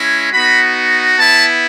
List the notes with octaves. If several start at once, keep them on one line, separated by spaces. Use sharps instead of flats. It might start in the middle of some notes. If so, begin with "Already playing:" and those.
Already playing: G#3 C#4 E4
B3 D#4 F#4 B5
B3 E4 A5